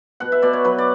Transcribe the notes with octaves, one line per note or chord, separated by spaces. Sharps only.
B2 F#5
E5
B2 D5
C#5
F#3 B4
D5